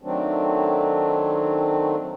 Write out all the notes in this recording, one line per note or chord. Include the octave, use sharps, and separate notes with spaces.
D#3 F#3 A3 C4 D4